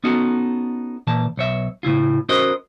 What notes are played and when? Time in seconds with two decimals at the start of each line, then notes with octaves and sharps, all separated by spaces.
0.04 B3 C#4 D#4 F#4 A4
1.07 A#2 E3 A5
1.37 B1 C#5 E5
1.83 A2 C#3 E4 F4
2.29 C#4 F#4 A#4 C5 D#5